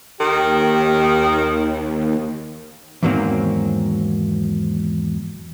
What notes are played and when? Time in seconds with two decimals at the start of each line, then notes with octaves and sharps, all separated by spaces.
0.20 D#2 D#3 G4
3.03 E2 G#2 D#3 F#3 A#3 C4